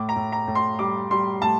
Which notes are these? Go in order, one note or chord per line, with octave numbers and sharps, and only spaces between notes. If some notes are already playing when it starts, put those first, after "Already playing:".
Already playing: A2 D6
A#5
A2
A#5
A2
C6
G3 D6
G3 C6
A2 A5